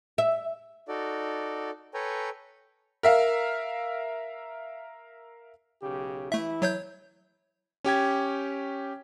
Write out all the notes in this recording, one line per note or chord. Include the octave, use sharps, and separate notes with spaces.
E5
D#4 F#4 A4 D5
A4 B4 C#5 G5 G#5 A#5
A#4 E5 F5
B1 C#3 G4
E3 A3 E4 E5
F#3 C#5 G6
C#4 G4 G5 G#6